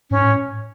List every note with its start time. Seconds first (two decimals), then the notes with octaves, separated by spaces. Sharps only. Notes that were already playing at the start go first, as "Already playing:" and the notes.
0.11 G#2 C#4
0.24 A2